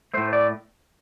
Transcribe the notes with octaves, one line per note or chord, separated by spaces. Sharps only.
A2 A3 C5
D5